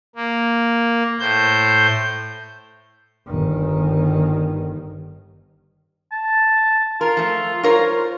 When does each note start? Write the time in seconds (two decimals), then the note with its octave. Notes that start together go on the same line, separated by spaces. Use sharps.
0.15 A#3
1.20 A2 C5 G6
3.27 G1 D#3
6.12 A5
7.01 F4 A#4
7.17 F3 A3
7.63 F4 A#4 C5 C#5